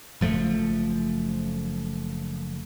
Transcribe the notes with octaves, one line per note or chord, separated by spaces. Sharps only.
F#1 F3 A3